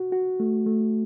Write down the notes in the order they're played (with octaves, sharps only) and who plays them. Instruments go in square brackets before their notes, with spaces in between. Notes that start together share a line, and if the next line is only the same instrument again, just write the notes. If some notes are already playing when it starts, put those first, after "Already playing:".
Already playing: [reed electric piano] F#4
F#4
A3
A3